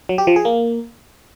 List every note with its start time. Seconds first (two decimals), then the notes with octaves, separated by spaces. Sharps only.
0.09 F#3
0.18 G4
0.27 F3
0.36 G#4
0.45 A#3